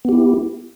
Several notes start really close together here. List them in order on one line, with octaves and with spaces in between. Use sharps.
B3 G4 E4